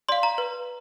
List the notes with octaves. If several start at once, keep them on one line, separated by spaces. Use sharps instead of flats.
D5 F5 C6
A#5
B4